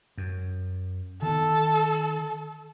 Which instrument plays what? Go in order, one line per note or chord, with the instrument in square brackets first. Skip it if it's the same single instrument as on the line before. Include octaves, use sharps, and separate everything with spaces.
[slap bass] F#2
[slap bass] D#3 B3 [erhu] A4